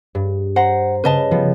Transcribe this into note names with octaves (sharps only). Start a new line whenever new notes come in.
G2
C5 F#5 A#5
C#3 B4 D#5 A5
F3 G3 B3